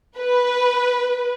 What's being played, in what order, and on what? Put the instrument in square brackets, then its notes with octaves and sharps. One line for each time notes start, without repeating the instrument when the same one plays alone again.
[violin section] B4